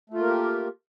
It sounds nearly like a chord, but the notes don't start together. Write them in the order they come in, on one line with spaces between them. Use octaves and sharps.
A3 F4 A#3 A#4 G4